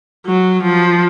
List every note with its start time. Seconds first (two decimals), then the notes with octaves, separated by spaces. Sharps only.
0.26 F#3
0.63 F3